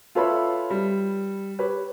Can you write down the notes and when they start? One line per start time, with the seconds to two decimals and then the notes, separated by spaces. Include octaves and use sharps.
0.15 F4 A4 B4 C#5 E5 B5
0.70 G3
1.59 G4 B4 C#5